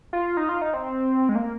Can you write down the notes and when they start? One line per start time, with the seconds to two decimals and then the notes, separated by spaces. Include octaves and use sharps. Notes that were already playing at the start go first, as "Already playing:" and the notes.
0.13 F4
0.37 D#4
0.49 F4
0.62 D#4
0.74 C4
1.29 G#3
1.35 A#3